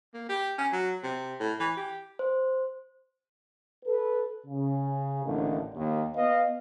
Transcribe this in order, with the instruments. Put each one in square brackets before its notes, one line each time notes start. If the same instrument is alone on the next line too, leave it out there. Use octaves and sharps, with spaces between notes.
[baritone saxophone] A#3
G4
C#4
F#3
C3
A2
E3
G4
[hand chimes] C5
[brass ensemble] A4 B4
C#3
A1 D#2 D3 D#3 D4
D#2
B3 B4 D#5 F5